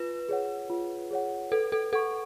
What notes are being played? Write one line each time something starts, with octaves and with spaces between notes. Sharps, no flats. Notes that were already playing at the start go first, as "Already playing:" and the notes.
Already playing: F4 B4
G#4 C#5 F#5
F4
G#4 C#5 F#5
A4 B4
A4
A4 F#5 C#6